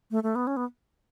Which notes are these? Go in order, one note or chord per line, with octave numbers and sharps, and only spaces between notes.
A3
A3
B3
C#4
B3